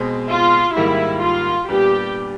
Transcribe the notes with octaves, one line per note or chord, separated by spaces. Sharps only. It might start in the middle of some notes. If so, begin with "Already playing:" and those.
Already playing: B2 G#3 C4
F4
G#2 D#3 G3 A#3 E4
F4
A#2 G3 B3 D4 G4